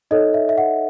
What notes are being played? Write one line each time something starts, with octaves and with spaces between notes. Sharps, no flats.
D#4 A4 C#5 D#5
E5
E5
F#5